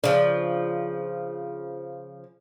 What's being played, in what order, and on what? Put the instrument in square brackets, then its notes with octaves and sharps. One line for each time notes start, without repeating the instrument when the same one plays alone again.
[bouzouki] C#3 F3 [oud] D4